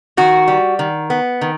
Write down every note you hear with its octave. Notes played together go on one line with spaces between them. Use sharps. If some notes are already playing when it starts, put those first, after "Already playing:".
D#3 F#4
G3
D#3
B3
D#3